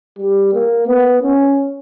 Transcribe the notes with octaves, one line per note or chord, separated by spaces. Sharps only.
G3
A#3
B3
C#4